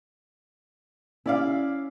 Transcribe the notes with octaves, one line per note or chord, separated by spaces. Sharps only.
C#4 E4 D5 F5